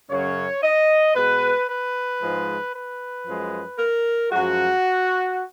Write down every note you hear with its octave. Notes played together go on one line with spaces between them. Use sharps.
F#2 C#3 F#3 C#5
D#5
B2 G#3 B4
B4
G#2 F3 G#3
B4
F#2 F3 G#3
A#4
F#2 F3 G#3 F#4